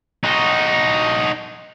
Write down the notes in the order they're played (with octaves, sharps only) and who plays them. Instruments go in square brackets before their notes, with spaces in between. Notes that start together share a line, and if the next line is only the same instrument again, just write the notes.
[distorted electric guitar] D#4 F#4